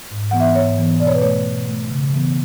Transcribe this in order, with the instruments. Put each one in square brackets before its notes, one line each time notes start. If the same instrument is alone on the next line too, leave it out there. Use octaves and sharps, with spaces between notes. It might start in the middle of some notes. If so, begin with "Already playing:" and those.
[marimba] G#2
E3 B3 F#5
E5
G#2 C#5
E3 B3
B2 D5
C#5
B4
A3 C#5
B2
A3
C#3
E3 B3